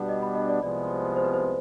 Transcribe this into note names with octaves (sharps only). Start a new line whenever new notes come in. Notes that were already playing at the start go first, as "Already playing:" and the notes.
Already playing: B2 G3 B3 D4 D5
D#5
B5
D#5
D5
C2 C3 F3 G#3 B3 D5
C5
B4
C5